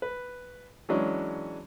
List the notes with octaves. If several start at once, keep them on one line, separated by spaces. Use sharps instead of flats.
B4
E3 F#3 G#3 C#4 D4